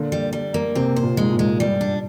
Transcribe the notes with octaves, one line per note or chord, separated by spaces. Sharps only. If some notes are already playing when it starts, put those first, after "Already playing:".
Already playing: A#2 D3
G3
G3
A#3
C3 C4
C5
A#2
G#2 G#3
A#2
G#3
G2 G3
D4